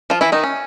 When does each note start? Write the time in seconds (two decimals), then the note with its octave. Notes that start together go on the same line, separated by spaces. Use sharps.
0.10 F3 F4
0.21 E3 E4
0.32 D#3 D#4
0.43 C#4